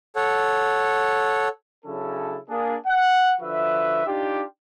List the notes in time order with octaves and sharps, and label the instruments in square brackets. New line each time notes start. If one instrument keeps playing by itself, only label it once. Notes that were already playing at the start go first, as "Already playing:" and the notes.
[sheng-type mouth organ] A4 C#5 F#5
[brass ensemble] C#3 F#3 C#4 D4 E4 A4
A#3 D4 G#4
F#5
D3 F3 F#4 B4 E5
D4 D#4 F4 G4